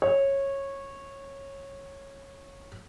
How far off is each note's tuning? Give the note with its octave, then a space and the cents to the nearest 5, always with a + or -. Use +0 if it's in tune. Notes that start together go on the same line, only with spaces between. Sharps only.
C#5 -15